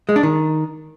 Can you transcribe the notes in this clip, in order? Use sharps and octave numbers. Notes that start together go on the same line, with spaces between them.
G#3
D4
D#3